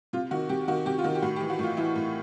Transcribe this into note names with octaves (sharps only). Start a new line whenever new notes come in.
C3 F4
D#3 F#4
C3 G4
D#3 F#4
C3 G4
F4
D#3 F#4
G4
A2 F#4
G4
E3
F#4
A2 F4
E3 E4
A2